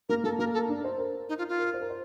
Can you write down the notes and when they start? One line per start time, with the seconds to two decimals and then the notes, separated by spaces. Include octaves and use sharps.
0.09 A#3 A#4
0.24 A#3 A4
0.39 A#3 A#4
0.54 A4
0.69 D4
0.84 C5
0.99 A#4
1.29 D#4
1.38 F4
1.49 F4
1.59 A#4
1.74 C5
1.81 A#4
1.89 C5